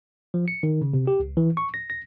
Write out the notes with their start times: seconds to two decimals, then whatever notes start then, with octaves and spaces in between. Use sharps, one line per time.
0.34 F3
0.48 C#7
0.63 D#3
0.81 C#3
0.94 C3
1.07 G4
1.20 C#2
1.37 E3
1.57 C#6
1.74 A#6
1.90 A#6